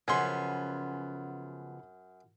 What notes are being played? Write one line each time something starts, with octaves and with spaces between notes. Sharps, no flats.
F#2 C#3 F3 B3 G#5 C6 C#6